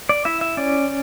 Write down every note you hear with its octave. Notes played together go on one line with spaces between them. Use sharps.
D5
E4 E5
E5
C#4 D5